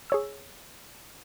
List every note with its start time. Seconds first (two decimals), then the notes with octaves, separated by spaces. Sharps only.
0.10 G#4 C#5 E6